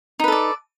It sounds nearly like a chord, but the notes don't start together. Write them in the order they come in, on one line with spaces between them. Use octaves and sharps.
D#4 B4 A4 D5